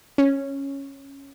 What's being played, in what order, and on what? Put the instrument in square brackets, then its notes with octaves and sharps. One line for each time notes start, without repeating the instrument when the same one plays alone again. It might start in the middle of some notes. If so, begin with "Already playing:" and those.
[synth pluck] C#4